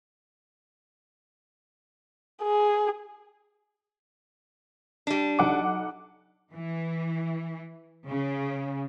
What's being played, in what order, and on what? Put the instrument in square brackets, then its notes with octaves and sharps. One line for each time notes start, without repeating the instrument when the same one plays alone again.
[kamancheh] G#4
[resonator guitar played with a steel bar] G3 D4
[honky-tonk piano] B1 F#5 D6
[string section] E3
C#3